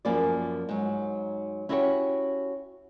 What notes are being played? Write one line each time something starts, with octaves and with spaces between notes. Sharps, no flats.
F#2 F3 A#3 G#4 B4 D5
G#2 F#3
C#4 E4 F#4 G4 B4 C#5